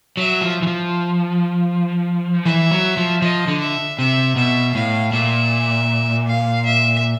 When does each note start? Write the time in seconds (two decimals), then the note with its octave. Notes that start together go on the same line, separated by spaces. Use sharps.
0.17 F#3 E5
0.42 F3
0.62 E3
0.67 F3
2.45 E3 E5
2.71 F#3
2.97 F3
3.22 F3 D#5
3.48 D3
3.60 E5
3.98 C3 E5
4.36 B2 E5
4.75 A2 F5
5.12 A#2 E5
6.27 F5
6.65 E5